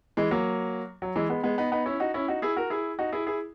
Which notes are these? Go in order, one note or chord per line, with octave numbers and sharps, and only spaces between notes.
E3 G#3
F#3 A#3
F#3
E3 G#3
G#3 B3
G#3 B3
B3 D#4
B3 D#4
C#4 E4
D#4 F#4
C#4 E4
D#4 F#4
E4 G#4
F#4 A#4
E4 G#4
D#4 F#4
E4 G#4
E4 G#4